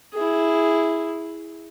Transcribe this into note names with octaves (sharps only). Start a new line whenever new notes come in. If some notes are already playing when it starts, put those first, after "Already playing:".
E4 G#4